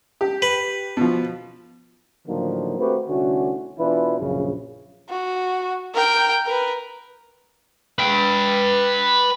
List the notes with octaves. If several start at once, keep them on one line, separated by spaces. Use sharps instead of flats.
G4
B4
B2 F3
A2 D3 D#3 F3 F#3 A#3
A3 C4 F#4 G4 A#4 B4
C2 D3 A3 C#4 F#4
B2 E3 D4 E4 F4 B4
A#1 F#2 C#3
F#4
A#4 G5
A#4 B4
B4 G5